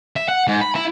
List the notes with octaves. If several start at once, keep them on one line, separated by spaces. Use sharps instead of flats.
E5
F#5
G#2
B5
E4